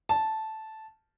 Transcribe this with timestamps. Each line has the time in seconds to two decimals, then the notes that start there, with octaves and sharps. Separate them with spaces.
0.09 A5